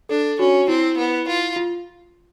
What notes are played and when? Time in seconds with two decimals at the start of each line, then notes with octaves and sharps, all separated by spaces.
0.09 D4 A4
0.39 C#4 F#4
0.68 C4 E4
0.97 B3
1.28 F4
1.56 F4